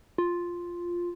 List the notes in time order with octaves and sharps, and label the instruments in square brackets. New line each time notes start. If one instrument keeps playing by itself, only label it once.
[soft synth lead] F4